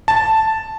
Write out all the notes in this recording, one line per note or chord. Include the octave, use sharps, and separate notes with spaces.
A5